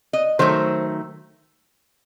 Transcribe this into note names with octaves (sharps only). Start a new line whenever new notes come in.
D#5
D#3 F#3 A3 C5